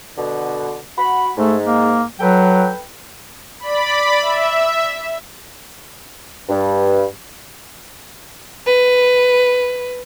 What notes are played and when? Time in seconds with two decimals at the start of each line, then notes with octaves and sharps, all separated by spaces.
0.17 B2 D3
0.98 F#4 B5
1.37 G#2 A3
1.66 A#3
2.20 F#3 A4 B4 G5
3.60 D5 B5
4.21 E5
6.49 G2
8.66 B4